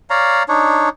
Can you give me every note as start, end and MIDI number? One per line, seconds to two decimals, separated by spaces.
0.10 0.43 73
0.10 0.43 74
0.10 0.43 77
0.10 0.43 82
0.49 0.89 62
0.49 0.89 63
0.49 0.89 73